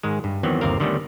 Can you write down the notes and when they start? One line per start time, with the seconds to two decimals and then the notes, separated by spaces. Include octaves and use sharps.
0.03 G#2 D#3 G#3
0.24 G2
0.43 E2 D#3 E3 F#3 B3 C4
0.61 G1 D#2 C3 C4 A#4 F5
0.80 D3 D#3 G3 A3 B3 C#4